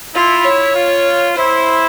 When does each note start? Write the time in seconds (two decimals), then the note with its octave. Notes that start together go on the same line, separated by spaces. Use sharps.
0.15 E4 F4
0.45 C#5
0.75 F4
1.36 E4 C5